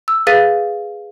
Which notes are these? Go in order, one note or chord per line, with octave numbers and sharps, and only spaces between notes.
E6
G#4 B4 F5 A6 B6 D#7